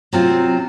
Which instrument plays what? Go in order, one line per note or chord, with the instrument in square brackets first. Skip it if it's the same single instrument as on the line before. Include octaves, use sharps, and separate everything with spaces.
[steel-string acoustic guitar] C3 F#3 C4 F4